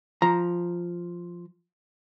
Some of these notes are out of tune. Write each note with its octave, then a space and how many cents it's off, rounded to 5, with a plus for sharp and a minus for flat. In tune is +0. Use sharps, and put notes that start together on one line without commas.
F3 +0 A#5 +0